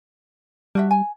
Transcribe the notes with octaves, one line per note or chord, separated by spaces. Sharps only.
G3 D4 F#4 E5
G#5